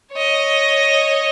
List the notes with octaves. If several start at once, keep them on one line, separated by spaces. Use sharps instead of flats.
C#5 D#5